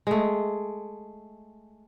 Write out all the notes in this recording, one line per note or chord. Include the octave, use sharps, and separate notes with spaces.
G#3 A3